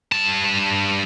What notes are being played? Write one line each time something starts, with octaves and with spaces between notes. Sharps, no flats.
G2 A5